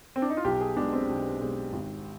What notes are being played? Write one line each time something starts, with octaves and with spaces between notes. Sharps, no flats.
C4
D4
D#4
F4
B1 G4
G#4
B2 G#3 D4
C4
B1
B2 G#3
G#1